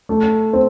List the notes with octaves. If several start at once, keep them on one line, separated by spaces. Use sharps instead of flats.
A3
C4